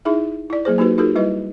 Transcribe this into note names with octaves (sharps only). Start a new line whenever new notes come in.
D#4 E4 G#4 E5
E4 D5
F#3 A#3 G#4 C5
A#3 D#4 F#4 G4 B4
D#4 F4 F#4 G#4 A#4
G3 E4 B4 D#5